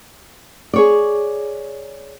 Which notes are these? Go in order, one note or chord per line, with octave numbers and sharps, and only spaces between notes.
G#4 C#5 D5